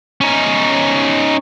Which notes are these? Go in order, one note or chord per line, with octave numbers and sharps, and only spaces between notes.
C#4 D#4